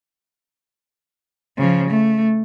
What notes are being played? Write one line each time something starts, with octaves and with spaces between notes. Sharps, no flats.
C#3 F3
A3